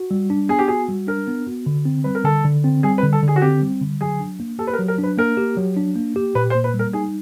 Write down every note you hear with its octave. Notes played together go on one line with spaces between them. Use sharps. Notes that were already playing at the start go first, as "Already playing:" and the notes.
Already playing: F#4
G3
D4
B3 G#4
G4
F#4 G#4
G3
D4 A#4
B3
F#4
D3
C4
G3 B4
A#4
D3 A4
D3
C4
G3 G#4
B4
D3
A4
D3
G#4
F#4
C4 G4
G3
D3
F#3 G#4
D4
A#3
G4 A4
B4
A#4
F#3
A#4
D4
B4
A#3 A#4
G4
F#3
D4
A#3
G4
A#2 B4
C5
A#3
B4
G3
A#4
D#4 G#4